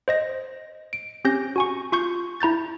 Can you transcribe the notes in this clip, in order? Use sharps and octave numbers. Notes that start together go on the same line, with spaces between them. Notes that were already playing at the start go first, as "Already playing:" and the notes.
C5 D#5 A#6
D7
C4 C#4 G4 G6 A#6
F#4 G#5 C#6
F4 C6 C#6 G6
E4 A#5 G6 A6